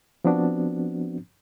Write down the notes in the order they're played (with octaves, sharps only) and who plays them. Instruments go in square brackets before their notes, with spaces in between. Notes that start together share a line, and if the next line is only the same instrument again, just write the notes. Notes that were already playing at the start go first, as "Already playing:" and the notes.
[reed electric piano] F3 B3 C4 D4 F#4